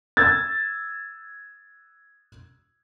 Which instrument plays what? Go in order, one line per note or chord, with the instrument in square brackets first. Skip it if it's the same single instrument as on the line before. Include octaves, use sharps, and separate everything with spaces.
[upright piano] E6 G#6 A6